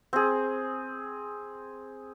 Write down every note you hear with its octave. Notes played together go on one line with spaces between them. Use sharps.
C4 G#4